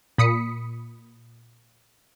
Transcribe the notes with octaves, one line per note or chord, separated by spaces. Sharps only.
A#2 B5 D#6 B6 C#7